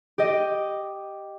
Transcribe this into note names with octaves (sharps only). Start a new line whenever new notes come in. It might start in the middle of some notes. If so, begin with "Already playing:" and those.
G4 D#5